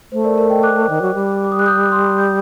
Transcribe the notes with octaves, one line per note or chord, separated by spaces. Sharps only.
A3 C5
A#4 D5
A#4 D5
D#5 G5
D6 F#6
D#3
F#3
G3
D6
D#6
F#6
D#6 G6
F#6
C6 D#6
D#6 G6